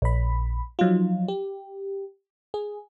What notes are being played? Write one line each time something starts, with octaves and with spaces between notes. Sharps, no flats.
A#1 B5
F3 F#3 D#4 F4
G4
G#4